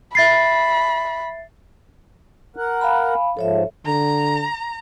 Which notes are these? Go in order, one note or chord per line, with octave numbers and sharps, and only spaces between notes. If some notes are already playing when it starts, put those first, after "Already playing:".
E5 B5 A6 C7
A#4 F#5
F5 G#5 B5
G#2 F3 A4 C#5 E5
D3 A#5